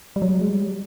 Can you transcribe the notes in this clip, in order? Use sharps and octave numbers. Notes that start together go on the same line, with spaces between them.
G3
F#3
G#3
G3